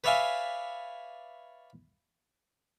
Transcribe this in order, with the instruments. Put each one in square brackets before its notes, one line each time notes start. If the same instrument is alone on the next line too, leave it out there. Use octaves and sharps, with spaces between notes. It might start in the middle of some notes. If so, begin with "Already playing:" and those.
[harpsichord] B4 C#5 D5 E5 F5 G#5